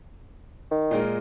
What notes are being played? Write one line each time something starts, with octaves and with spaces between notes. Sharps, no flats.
D#3
A#2 G#3 A#4